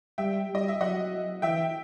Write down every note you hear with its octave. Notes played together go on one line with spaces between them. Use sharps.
G3 E5 G5
G3
D#5
E5
F#3 D#5 F#5
E3 E5 G5